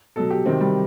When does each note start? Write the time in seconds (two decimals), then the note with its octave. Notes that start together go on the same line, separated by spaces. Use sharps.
0.16 B2 F#3 A4
0.30 G4
0.46 C3 D#3 F#3 C4
0.60 G3